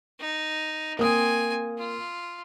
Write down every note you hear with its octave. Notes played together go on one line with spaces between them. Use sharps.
D#4
A#3 C4 G#5 D#6
F4